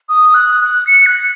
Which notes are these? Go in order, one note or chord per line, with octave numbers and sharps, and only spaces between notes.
D#6
F#6
F#6
C#7
F#6